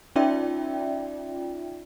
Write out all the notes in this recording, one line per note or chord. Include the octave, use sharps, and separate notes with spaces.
C#4 D#4 F4 D5 E5 G5